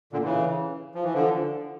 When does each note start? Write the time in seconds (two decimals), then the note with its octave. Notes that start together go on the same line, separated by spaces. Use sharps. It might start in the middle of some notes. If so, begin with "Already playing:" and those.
0.13 A#2 D3
0.24 C#3 E3
0.95 F3
1.04 E3
1.14 D3 F3